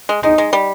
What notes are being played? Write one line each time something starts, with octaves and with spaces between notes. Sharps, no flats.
G#3
G#3 D#4
G#3
G3